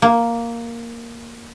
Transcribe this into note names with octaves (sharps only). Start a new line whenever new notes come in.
A#3